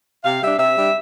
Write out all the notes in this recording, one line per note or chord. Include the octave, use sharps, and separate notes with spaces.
C3 F5
G3 D4 E5
C3 E5
G3 D4